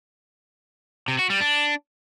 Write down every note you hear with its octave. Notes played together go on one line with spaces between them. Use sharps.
C3
F#4
G3
D4